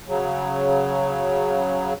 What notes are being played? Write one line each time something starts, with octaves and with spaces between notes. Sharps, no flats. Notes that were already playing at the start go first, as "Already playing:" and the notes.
C#3 F#3